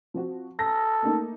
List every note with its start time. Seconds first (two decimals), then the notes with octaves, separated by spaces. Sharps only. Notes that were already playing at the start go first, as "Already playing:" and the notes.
0.14 F3 C4 F#4
0.59 A4 A#6
1.02 A3 A#3 D#4